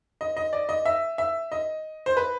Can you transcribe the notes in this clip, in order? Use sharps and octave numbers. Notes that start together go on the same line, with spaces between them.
D#5
D#5
D5
D#5
E5
E5
D#5
C5
B4